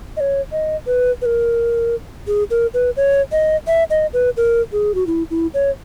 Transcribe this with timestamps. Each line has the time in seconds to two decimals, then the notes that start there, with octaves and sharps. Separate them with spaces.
0.17 D#5
0.20 C#5
0.52 D#5
0.87 B4
1.22 B4
1.26 A#4
2.27 G#4
2.50 A#4
2.74 B4
2.97 C#5
3.32 D#5
3.67 E5
3.90 D#5
4.13 B4
4.37 A#4
4.72 G#4
4.95 F#4
5.07 E4
5.30 E4
5.54 C#5